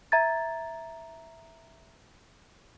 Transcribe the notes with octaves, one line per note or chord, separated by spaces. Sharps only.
E5 A#5 G#6 A6